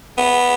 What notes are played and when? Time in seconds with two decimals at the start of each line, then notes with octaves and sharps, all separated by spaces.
0.18 B3